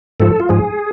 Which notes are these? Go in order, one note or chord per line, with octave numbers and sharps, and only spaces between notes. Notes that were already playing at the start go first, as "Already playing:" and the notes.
G#2 F3 A4
F4
G#2 F3 G#4